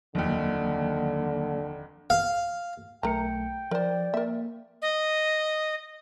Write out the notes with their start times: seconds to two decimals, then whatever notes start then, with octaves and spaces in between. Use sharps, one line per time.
0.15 F1 D#2 D3 D#3 F#3 A#3
2.10 F5
3.03 B1 A3 A#4 G5 A#5 C#7
3.71 F3 A#4 C5 D5
4.14 A#3 A#4 E5
4.82 D#5